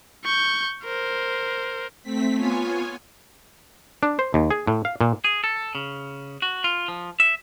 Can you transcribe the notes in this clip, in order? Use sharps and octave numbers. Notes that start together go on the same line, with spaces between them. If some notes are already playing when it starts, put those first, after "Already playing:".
C#6 G6
A#4 C5
A3 C4 B6
B3 F4 C#5 G#5
D4
C5
D#2
G#4
A2
F5
A#2
G#4
A4
C#3
F#4
F4
F3
E5